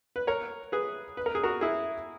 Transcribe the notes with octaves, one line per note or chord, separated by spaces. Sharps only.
B4
A#4 C#5
G#4 B4
B4
A#4
G#4
F#4 A#4
E4 G#4